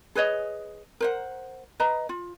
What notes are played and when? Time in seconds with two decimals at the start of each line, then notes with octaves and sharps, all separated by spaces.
0.15 G#4 B4 C#5 D#5
1.00 A#4 C5 F#5
1.80 B4 D#5 A#5
2.09 F4